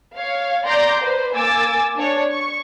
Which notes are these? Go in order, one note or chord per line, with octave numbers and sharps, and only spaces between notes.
C#5 F5
D5 A#5 C6 D6 G6
B4 C5
A#3 G#5 D6 E6 A6
D4 C#5
C#6